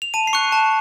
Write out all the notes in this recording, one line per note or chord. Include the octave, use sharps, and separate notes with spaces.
F7
A5 D#7
C7
C#6 F#6 C#7
A5